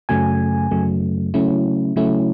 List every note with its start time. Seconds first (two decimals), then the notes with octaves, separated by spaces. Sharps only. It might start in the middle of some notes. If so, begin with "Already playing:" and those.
0.09 F#2 C#3 F#3 A3 G#5
0.71 F#2 C#3 F#3 A3
1.34 C#3 F#3 A3 C#4 E4
1.96 C#3 F#3 A3 C#4 E4